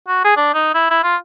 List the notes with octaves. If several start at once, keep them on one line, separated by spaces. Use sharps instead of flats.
F#4
G#4
D4
D#4
E4
E4
F4